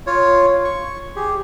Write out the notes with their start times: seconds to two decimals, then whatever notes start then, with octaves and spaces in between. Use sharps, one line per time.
0.07 F4 C#5
0.65 C#6
1.16 G4 G#4